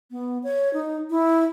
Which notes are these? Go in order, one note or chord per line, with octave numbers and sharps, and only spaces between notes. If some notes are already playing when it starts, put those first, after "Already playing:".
B3
C#5
D#4
E4